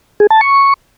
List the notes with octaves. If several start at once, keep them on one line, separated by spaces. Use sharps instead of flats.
G#4
A5
C#6